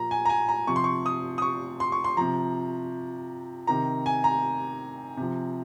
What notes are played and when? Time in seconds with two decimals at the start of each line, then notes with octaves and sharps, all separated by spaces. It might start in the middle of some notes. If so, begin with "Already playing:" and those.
Already playing: A#2 F3 A#5
0.11 G#5
0.25 A#5
0.29 G#5
0.48 A#5
0.67 C3 F3 C#6
0.76 C6
0.84 C#6
1.06 D#6
1.38 D#6
1.42 C#6
1.80 C6
1.92 C#6
2.04 C6
2.17 C3 F3 A#5
3.67 C3 D#3 A#5
4.06 G#5
4.24 A#5
5.17 C3 F3